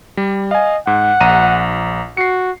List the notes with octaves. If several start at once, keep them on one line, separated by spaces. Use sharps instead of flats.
G3
D#5 F5 G#5
G#2 F#5
A#1 A#5 D#7
F#4 C7 C#7